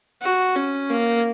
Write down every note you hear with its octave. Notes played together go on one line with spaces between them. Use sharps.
F#4
C#4
A#3